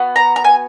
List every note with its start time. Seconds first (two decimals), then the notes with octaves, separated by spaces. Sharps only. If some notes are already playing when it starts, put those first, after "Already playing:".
Already playing: B3 F#4
0.16 A#5
0.36 A#5
0.44 G#5